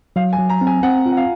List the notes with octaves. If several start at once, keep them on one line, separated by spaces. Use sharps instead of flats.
F#3 F5
G#5
F#3
A#5
C4
G#5
C4 F#5
F4
F#5
F5